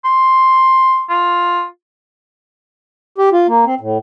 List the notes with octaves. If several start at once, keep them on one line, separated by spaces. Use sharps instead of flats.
C6
F4
G4
F4
A#3
C4
A2